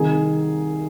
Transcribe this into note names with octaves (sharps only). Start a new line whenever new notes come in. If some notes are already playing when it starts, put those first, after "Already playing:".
Already playing: C2 C3 D#3 G#4